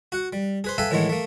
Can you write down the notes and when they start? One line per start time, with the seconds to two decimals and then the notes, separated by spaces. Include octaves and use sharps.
0.12 F#4 F#5
0.33 G3
0.64 G#4 B4 C5
0.78 A4 B4 E5 F5 G5 G#5
0.91 A2 D#3 E3 G#3 A3 B3
1.09 A3 A#3